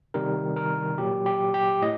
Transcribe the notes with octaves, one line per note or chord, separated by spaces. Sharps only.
C3 D#3 G3 A#4
A#4
A#2 F#3 G4
G4
G4
A2 D#5